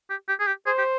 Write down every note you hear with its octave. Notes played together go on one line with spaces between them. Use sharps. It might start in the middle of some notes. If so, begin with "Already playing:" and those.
G4
G4
G#4
G4
G#4 C5
G4